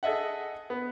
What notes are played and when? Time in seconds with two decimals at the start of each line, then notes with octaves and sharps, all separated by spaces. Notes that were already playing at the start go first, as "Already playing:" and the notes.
0.03 G#4 A4 D#5 E5 F#5
0.70 B3